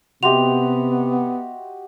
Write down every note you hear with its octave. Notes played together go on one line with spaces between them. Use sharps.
C3 B3 F#4 G4 D#5 E5 C6 F7